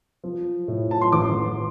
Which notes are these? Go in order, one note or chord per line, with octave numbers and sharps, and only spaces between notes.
F3
A2
A5
C6
A1 D6